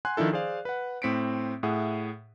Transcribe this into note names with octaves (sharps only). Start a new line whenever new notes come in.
F#5 G#5 C6 F#6
D#3 F3 D4 E4 A4
G#4 C5 D5 F5
B4 F#5
A2 C4 B6 C#7 D7
A2 G#4 E5 F#5